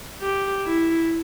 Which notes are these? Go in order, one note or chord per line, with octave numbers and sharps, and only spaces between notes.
G4
E4